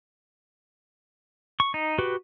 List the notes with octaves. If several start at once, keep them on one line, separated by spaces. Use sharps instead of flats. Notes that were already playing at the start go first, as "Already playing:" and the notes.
C#6
D#4
F#4 G4 B4